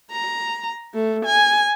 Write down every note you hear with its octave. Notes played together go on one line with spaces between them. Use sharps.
A#5
A3
G#5